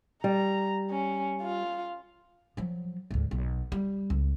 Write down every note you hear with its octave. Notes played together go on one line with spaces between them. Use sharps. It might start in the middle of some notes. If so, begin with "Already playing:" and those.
G3 A#5
C#4
F4
F3 F#3
D2 G#2
B1
G3
C#2